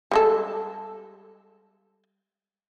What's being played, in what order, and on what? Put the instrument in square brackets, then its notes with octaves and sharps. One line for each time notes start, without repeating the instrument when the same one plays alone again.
[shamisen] G3 G#3 A4